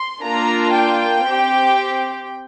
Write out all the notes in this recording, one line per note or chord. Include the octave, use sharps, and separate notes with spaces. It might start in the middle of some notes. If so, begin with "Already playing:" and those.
Already playing: C6
A#3 D4 F4 A#5
G5
C4 G4